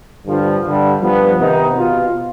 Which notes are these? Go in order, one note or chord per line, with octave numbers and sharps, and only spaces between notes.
G2 D3 F3
G2 D3 G3
G2 F3 B3
C3 D#3 B3 D#4
B2 B3 F4